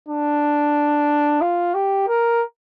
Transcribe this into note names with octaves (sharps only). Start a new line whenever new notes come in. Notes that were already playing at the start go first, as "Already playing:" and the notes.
D4
F4
G4
A#4